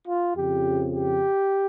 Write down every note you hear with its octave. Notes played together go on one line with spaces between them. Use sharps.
F4
F2 C#3 F3 G4
G4